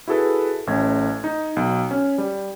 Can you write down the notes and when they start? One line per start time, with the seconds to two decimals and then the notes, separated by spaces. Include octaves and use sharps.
0.08 E4 F#4 G#4 A4 B4
0.67 A1 A3 C#4 G#6
1.24 D#4
1.56 B1
1.91 C#4
2.18 G3